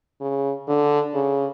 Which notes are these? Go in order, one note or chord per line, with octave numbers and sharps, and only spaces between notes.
C#3
D3
C#3